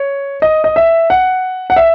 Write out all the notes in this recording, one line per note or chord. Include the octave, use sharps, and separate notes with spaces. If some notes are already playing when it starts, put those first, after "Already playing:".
Already playing: C#5
D#5
D#5
E5
F#5
F#5
E5